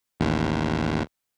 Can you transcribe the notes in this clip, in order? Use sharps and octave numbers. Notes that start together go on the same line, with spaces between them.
A1 D#2